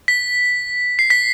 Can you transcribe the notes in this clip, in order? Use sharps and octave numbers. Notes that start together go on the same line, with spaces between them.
B6
C7
B6